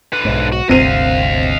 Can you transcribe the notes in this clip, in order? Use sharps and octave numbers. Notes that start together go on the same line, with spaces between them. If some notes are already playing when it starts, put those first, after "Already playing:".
D3 B4
B1 G#2
F#4
G1 D2 C3 C4 D#5 F5 D#7